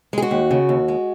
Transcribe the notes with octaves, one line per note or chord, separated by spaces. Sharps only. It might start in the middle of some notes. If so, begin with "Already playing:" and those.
G#3 G#4
F#4
D#2
C#3
D#2
G#3